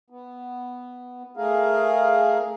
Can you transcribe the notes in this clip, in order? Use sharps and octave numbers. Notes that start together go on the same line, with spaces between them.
B3
A3 G#4 A#4 F5